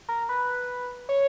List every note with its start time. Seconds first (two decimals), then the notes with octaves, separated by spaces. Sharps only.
0.09 A#4
0.29 B4
1.09 C#5